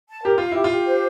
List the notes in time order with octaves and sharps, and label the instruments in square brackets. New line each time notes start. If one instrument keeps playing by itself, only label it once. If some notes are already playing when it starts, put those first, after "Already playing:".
[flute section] A5
[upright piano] G4 [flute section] A#4
[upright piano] F4 [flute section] F5
[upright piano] E4 [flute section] G4
[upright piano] F4
[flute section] G4
C5